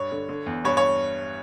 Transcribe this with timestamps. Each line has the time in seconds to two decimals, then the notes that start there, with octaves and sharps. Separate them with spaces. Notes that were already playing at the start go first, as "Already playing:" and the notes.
Already playing: G2 C#5
0.12 D3
0.29 D3
0.46 E2
0.64 G2 C#5
0.77 C#5